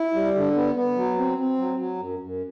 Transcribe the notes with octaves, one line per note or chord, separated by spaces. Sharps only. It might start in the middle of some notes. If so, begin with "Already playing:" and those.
Already playing: E4
G3
D3
B3
B3
F#3
C4
C4
F#3
F#3
F#2
F#2